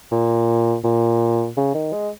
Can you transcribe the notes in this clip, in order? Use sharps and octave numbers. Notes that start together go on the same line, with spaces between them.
A#2
A#2
C#3
D#3
G#3